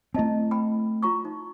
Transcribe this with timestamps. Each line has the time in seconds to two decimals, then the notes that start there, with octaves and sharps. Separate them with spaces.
0.14 A3 C4 E4 D#5 A5
0.51 G5 B5
1.03 F4 A#5 C#6
1.25 D#4